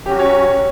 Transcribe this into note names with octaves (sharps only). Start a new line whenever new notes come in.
F#3 C#4 F#4 G4
C#5